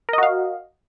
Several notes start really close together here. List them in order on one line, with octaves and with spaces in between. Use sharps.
A#4 D#5 F#4 F5